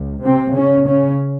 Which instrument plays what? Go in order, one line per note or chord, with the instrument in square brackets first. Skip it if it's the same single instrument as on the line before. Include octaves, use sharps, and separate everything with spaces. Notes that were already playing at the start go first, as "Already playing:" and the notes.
Already playing: [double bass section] C#2
C3 C4
C#3 C#4
C#3 C#4